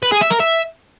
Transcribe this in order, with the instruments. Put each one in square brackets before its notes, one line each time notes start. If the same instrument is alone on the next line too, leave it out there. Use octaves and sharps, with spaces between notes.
[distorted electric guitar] B4
G#4
E5
A#4
E5